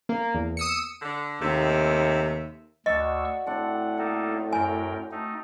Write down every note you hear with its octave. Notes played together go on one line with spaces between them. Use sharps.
A#3
E2
D#6 E6 C#7
D3
D#2 C3 A3 E5
D2 F#4 D5 D#5 F#5 C#6 E6
A2 C4 D4 F#5
A#3 D#4 A4
F#2 A#4 G5 G#5
A3 D#4